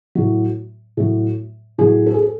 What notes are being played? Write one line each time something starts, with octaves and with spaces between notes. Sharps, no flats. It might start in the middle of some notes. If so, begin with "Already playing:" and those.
A2 F#3
A2 F#3
A2 F#3 G#4
A4
G#4
A4